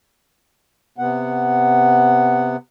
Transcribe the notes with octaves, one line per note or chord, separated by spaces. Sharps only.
C3 B3 F#5